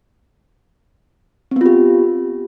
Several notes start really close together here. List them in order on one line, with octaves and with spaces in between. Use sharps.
C4 B3 F4 G4